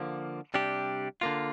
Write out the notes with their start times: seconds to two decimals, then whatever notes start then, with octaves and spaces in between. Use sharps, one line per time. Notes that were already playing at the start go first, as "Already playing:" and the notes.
Already playing: D3 F3 A#3
0.54 C3 G3 D4 G4
1.21 D3 A#3 F4